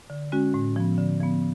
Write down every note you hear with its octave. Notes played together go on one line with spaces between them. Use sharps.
D3
G#3 C#4 F#4
A2
F3 B3
D3
F3 B3